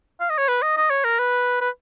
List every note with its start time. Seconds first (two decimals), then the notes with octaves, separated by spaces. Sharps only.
0.20 F5
0.30 D#5
0.38 C#5
0.49 B4
0.63 D#5
0.77 D#5
0.90 C#5
1.04 A#4
1.19 B4
1.61 B4